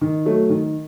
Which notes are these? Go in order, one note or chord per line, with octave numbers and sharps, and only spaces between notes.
D#3
F#3 A3
D#3